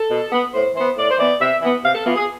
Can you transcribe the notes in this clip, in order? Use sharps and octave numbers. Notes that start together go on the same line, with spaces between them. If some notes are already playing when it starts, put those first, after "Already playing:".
Already playing: A4
B2
B3
A2 C5
E3 B3 C5
A2 D5
C5
E3 B3 D5
C3 E5
E3 B3
C3 F5
A4
E3 B3 F4
G#4